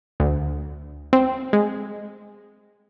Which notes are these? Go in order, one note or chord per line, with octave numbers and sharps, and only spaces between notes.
D2
C4
G#3